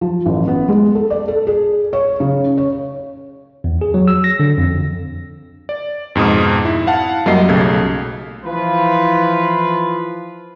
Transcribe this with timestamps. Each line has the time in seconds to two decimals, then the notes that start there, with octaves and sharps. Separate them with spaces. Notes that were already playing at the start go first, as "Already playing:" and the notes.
0.01 F3
0.26 A1
0.48 B3
0.68 G#3
0.95 A4
1.10 D5
1.28 A4
1.47 G#4
1.93 C#5
2.20 C#3
2.57 C#5
3.64 E2
3.81 G#4
3.94 F#3
4.08 E6
4.24 A#6
4.40 D3
4.58 F2
5.69 D5
6.15 F2 G#2 B2 D#6
6.65 E4
6.87 F5 F#5 A5
7.26 F#2 F#3 G3 A#3 D#5 C7
7.49 B1 C#3 A3 G4 A4 G#6
8.46 E3 F3 E4 F4 B4